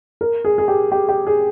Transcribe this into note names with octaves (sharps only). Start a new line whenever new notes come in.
A#4
G#4
G#4
G4
G4
G4
G#4